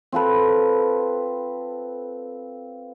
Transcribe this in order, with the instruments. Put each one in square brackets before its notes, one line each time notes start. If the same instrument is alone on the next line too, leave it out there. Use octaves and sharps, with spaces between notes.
[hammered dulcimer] C4 F4 A4 B4